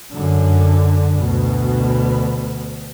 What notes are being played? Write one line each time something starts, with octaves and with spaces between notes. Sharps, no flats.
F#2 D3
D2 B2